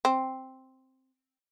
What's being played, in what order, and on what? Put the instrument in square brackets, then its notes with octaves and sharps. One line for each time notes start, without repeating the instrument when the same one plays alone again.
[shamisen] C4